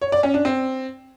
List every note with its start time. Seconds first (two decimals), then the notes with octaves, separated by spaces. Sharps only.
0.02 C#5
0.12 D5
0.23 C#4
0.34 D4
0.45 C4